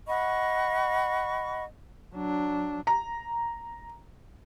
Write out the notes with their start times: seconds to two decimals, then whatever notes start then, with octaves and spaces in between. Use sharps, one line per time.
0.07 D#5 F#5 B5 C#6
2.14 F#3 D4
2.87 A#5